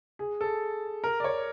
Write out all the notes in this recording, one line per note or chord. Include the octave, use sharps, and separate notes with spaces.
G#4
A4
A#4
D5
C#5